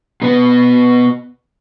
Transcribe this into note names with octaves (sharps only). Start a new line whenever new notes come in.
B2 B3